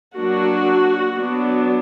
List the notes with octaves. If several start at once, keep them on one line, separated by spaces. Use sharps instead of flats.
F#3 A#3 D4 F#4
F#3 B3 D4